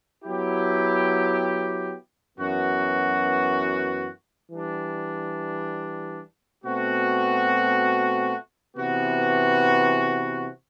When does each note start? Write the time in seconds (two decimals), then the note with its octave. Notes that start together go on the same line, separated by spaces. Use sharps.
0.24 F#3 B3 E4 G4
2.37 F#2 E3 B3 F#4
4.50 E3 G3 D4
6.63 B2 A3 C4 F#4
8.76 C3 E3 B3 F#4